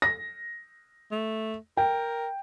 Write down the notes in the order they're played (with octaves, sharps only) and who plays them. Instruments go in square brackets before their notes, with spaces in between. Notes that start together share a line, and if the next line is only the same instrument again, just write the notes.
[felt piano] A#6
[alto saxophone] A3
[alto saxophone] A#4 [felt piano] G5